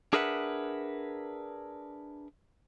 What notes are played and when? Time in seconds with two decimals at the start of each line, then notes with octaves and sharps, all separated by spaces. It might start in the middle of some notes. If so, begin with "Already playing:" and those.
0.13 D4 G#4 A#4 B4 E5 F#5